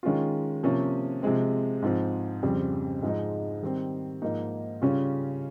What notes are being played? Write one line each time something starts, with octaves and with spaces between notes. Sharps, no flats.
D#3 G#3 C#4 F4
C3 F3 A#3 C#4
C3 F3 G#3 C4
G#2 F3 C4
F2 C#3 G3 C4
G#2 F3 G#3 D#4
D#3 G3 C4
G#2 F3 A#3 D#4
C#3 G3 C#4 F4